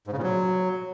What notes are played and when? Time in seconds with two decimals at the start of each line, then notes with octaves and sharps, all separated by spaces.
0.07 G#2
0.12 C#3
0.17 A#2
0.23 F#3